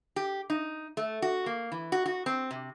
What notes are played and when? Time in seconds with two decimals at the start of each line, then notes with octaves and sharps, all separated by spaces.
0.16 G4
0.50 D#4
0.97 A3
1.22 F#4
1.46 A#3
1.72 E3
1.92 F#4
2.06 F#4
2.26 C4
2.51 C3